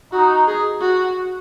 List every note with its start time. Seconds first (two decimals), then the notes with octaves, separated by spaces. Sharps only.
0.12 D#4 F#4
0.47 G#4
0.81 F#4